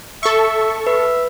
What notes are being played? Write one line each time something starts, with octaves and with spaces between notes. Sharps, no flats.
A4 E5 C#6
B4 E5